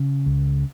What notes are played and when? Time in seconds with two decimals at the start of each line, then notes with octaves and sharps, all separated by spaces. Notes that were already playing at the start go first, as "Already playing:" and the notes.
Already playing: C#3
0.26 C#2